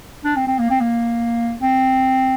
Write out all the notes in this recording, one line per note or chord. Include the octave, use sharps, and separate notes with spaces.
D4
C4
C4
A#3
C4
A#3
C4